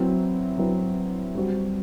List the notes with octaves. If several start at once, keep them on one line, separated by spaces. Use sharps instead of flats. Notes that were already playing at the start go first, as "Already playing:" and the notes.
Already playing: F#3 C4 E4 B4
F#3 C4 E4 B4
G3 C4 F#4 C5